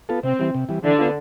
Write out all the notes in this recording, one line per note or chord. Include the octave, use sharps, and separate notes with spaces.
B3 F4 A4
C3 C4
E3 G3
C3
E3 G3
D3 E3 D4
B3 F4